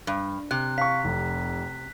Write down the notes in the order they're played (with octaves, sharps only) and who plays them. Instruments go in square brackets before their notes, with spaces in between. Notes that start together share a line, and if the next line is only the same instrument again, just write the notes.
[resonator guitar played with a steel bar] G2
[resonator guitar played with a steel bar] C3 [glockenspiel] F#6
[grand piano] F5 C#6 [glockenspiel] B6
[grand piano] F1